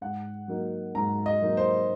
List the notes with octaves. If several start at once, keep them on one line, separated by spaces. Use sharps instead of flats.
G#2 F#5
F#3 A#3 D#4
G#2 A#5
D#5
F#3 A#3 D#4
C5